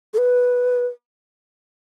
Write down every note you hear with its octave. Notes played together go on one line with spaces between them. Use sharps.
A4
B4